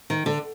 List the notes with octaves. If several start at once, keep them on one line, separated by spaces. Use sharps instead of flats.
D#3
D3